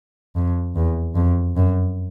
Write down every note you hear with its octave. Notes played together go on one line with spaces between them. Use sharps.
F2
E2
F2
F#2